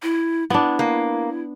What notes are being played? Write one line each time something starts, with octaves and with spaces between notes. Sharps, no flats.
E4
B3 D4 E4
A#3